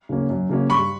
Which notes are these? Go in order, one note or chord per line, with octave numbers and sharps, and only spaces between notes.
C#3 F#3 A#3 C#4
F#2
C#3 F#3 A#3 C#4
G2 B5 C#6